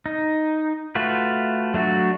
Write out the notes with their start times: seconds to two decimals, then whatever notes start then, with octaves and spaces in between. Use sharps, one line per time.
0.06 D#4
0.95 A3 F4 F#4 B4
1.74 F#3 A3 D4 F#4